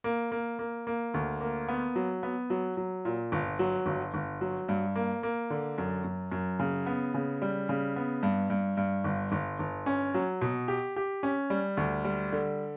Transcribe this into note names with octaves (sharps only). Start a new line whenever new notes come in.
A#3
A#3
A#3
A#3
D2
A#3
B3
F#3
B3
F#3
F#3
A#2
G1
F#3
G1
G1
F#3
G2
A#3
A#3
D3
F#2
F#2
F#2
C#3
B3
C#3
G3
C#3
B3
G2
G2
G2
G1
G1
G1
C#4
F#3
B2
G4
G4
C#4
G3
D2
G3
D3